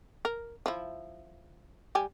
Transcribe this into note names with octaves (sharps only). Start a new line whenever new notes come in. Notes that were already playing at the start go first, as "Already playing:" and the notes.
A#4
F3 E4
G3 G4 G#5